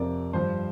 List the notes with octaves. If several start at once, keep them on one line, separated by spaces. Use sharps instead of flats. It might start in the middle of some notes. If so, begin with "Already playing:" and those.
Already playing: F2 C3 F3 A#4 D5
G2 F3 C5